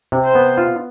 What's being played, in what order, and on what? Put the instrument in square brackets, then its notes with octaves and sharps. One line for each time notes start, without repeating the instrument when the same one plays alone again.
[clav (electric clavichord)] C3
[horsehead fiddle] C5
[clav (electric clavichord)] B3
F4